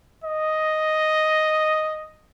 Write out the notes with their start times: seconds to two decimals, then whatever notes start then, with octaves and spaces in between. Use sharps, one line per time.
0.24 D#5